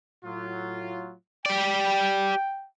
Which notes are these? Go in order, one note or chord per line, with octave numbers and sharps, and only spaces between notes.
A2 F#3 F4
G4 D5 G5